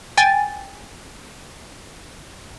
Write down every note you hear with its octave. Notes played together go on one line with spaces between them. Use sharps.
G5 G#5 A6